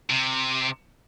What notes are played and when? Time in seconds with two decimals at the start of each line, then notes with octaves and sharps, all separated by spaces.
0.10 C3